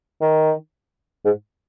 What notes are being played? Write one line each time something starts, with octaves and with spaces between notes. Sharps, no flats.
D#3
G#2